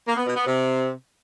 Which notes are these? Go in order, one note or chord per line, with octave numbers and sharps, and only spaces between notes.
A#3
B3
B2
B3
C3